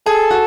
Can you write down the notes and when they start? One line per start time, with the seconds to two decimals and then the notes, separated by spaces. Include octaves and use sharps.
0.06 G#4 A4
0.31 F#4